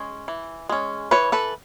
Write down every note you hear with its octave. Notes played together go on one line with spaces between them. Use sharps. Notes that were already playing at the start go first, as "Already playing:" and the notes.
Already playing: G#3 C#4
E3
G#3 C#4
E3 B4 C#5
A4 B4